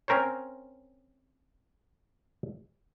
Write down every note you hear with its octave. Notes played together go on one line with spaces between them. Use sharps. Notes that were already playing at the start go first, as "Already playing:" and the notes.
C4 C#4 A#4 C5 C#5